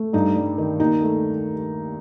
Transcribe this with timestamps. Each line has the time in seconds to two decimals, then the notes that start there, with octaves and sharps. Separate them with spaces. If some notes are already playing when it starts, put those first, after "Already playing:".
Already playing: A3
0.13 G2 D#4
0.36 G3
0.58 D#3
0.80 D#2 D#4
1.02 A3